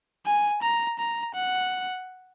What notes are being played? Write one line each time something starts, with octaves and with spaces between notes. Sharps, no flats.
G#5
A#5
A#5
F#5